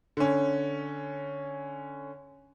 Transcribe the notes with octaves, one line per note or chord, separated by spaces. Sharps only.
D3 C#4